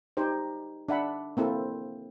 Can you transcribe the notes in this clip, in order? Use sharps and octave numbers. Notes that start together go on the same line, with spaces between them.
D#4 G4 C5
D4 E5 F#5 B5
A#3 C4 E4 A4